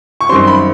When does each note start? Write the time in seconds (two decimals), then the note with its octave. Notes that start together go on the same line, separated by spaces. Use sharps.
0.21 C#6
0.29 F#2 D#3 G3 C4 C6
0.47 B5